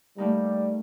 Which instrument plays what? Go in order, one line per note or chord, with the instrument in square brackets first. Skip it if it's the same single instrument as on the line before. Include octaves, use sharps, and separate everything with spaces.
[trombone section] G3 [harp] A3 A#3 D#4